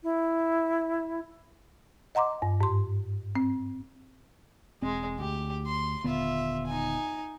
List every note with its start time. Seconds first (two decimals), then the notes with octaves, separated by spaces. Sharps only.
0.03 E4
2.15 D#5 F#5 A#5 C6 D6
2.42 G2
2.61 G#2 C6
3.36 C4
4.82 E1 G#3 C4
5.19 D2 G4
5.67 C6
6.04 D#1 D3 B3 F4 E5
6.67 D#4 G#5